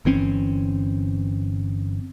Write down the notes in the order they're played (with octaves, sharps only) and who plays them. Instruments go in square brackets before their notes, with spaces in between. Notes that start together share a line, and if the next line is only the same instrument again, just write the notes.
[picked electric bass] G1 E3 C4 C#4